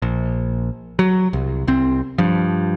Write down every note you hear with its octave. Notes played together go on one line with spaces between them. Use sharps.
A#1
F#3
C2
C2 C4
G2 F3